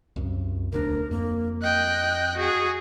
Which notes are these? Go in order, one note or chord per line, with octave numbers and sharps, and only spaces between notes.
C2 F#2
E1 D2 D4 A#4
F2 A#3
D#5 G5 F#6
F#4 G#4